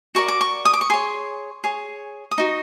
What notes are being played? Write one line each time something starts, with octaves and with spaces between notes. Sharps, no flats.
F#4 A#4 D5 C#6
D6
C#6
D#6
D6
C#6
G#4 C#5 C6
G#4 C#5
D#6
D#4 F#4